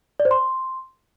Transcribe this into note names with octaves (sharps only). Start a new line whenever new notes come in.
D5
C5
C6